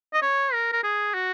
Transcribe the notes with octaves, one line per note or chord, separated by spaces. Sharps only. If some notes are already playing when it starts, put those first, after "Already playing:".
D#5
C#5
A#4
A#4
G#4
F#4